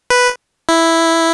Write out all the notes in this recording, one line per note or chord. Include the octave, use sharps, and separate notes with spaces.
B4
E4